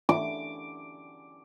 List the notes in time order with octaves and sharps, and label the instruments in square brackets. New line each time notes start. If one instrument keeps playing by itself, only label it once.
[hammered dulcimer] D6